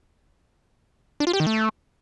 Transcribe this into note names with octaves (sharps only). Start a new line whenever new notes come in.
D4
F4
G4
D#3
A3